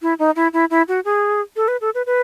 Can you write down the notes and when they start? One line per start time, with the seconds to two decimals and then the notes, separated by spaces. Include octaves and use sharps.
0.02 E4
0.19 D#4
0.36 E4
0.53 E4
0.70 E4
0.88 F#4
1.05 G#4
1.56 A4
1.68 B4
1.81 A4
1.95 B4
2.06 B4